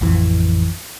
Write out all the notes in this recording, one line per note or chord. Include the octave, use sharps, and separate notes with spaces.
A1 F2 E3